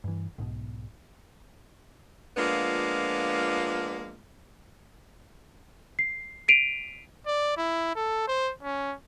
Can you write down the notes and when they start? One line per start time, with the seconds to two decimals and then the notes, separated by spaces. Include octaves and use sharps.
0.04 G2 E3
0.38 B1 G#2 B2
2.37 F3 G#3 A#3 B3 D4 F4
5.99 C7
6.48 B6 C7 D7 D#7 F7
7.27 D5
7.57 E4
7.96 A4
8.28 C5
8.63 C#4